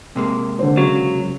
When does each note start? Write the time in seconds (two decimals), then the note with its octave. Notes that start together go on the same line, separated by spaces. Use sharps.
0.16 C3 G#3 A#3
0.59 D3 C5
0.77 C#3 F#3